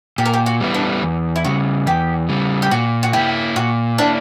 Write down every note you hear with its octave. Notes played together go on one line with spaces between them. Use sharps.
A#2 G4
A#4
G4
F#4
G3 B3 E4
D4
E2
E4
C#3 G3 F#4
E2 G4
C#3 G3
G4
A#2 F#4
F#4
A#3 E4 G4
A#2 F#4
A#3 D4 E4